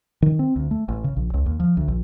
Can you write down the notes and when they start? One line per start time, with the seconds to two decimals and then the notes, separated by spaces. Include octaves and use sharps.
0.22 D#3
0.39 C4
0.56 D2
0.71 A3
0.88 A1
1.04 C#3
1.16 A#1
1.34 C#2
1.46 D#2
1.60 F3
1.77 D2
1.88 A#1